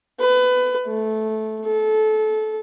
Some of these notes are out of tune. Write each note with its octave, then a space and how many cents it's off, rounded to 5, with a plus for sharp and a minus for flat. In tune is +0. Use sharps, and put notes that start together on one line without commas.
B4 +25
A3 -15
A4 -25